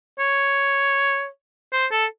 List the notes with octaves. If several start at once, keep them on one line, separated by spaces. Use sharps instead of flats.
C#5
C5
A4